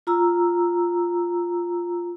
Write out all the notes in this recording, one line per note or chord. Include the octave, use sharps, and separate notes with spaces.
F4 A#5 E6